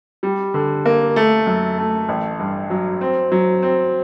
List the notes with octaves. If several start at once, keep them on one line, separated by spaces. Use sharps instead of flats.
G3
D3
A#3
A3
F#2
A3
A1
G2
F#3
C4
F#3
C4